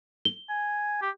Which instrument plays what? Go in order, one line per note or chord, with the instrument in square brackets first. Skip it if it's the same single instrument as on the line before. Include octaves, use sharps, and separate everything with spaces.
[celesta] G7
[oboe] G#5
G4